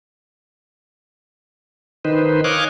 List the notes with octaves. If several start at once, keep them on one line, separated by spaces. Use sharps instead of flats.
D#3 D#4 B4 C5
C#5 D#5 F5 G#5 D6 F#6